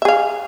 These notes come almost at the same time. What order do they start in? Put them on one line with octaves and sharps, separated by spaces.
E5 G#4 F5